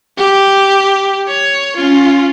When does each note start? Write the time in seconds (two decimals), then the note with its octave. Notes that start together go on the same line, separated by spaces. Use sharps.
0.18 G4
1.28 C#5
1.76 C#4 F4